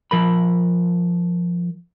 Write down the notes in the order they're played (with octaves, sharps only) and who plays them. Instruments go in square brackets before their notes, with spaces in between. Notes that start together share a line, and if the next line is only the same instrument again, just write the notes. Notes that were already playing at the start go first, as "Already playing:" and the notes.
[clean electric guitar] F3 A#4 B5